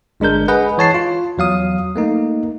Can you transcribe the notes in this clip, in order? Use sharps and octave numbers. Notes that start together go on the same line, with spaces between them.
G1 G#3 D4 A#4 G6
G#4 B4 D#5 F#5
E3 C#5 A5 C7
F4
E2 F#3 F5 D#6
A3 A#3 D#4